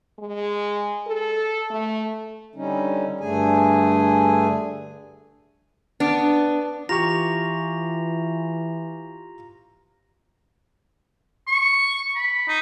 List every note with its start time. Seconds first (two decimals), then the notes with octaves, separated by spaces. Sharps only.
0.19 G#3
1.07 A4
1.70 A3
2.55 D3 G3 C#4 D#4
3.21 G2 D3 A3 G#4 G#5
6.00 B3 D4
6.89 E3 F4 G4 A#5 C#6 A#6 F7
11.47 C#6
12.16 B5
12.48 D#4